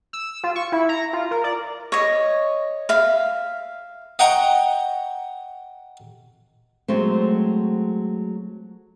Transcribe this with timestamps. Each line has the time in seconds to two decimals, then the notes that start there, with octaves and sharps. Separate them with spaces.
0.13 E6
0.43 F4
0.56 C#6
0.72 E4
0.89 A#5
1.13 F4
1.31 A#4
1.44 D5
1.92 C#5 D#5
2.89 E5 F5
4.19 D#5 F#5 G5 A#5 C#6 D#6
6.88 F#3 G#3 A3 C4